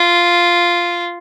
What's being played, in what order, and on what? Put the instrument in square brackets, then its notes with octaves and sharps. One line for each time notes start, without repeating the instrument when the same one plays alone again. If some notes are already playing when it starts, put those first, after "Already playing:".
Already playing: [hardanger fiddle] F4